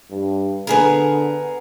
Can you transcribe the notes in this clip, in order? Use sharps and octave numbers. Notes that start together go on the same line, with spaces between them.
G2
D3 B3 G#4 A#4